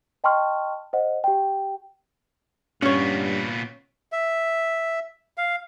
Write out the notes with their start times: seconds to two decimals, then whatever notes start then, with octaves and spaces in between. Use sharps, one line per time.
0.24 D#5 G5 A5 C6 C#6 F6
0.93 C5 D#5 F#5
1.24 G4 G5
2.82 G2 A#2 B3 C#4 C#5
4.12 E5
5.37 F5